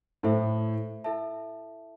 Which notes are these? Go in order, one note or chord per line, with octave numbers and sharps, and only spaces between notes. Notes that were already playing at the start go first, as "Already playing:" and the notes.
A2 E4 A4 C5 E5
E4 A4 E5 A5